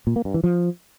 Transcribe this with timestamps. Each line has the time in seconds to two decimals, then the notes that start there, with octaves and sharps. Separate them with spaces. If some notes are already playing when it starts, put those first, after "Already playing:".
0.07 A#2
0.16 A#3
0.25 G2
0.34 E3
0.44 F3